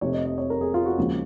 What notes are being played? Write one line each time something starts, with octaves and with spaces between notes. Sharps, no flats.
F1 F2 C3 C#5
D#5
D#5
C#5
A#4
G#4
F4
F#4
D#2 C#3 F3 G#3